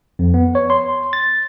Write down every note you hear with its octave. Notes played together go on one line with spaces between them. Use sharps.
F2
B3
C#5
C6
A6